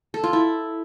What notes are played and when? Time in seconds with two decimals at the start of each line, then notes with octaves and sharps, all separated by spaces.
0.14 A4
0.24 F4
0.33 E4